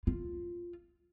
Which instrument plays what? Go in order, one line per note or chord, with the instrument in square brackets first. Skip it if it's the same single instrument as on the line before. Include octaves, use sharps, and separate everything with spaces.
[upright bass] F4